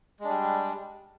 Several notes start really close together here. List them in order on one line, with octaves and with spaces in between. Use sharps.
G#3 D4 G3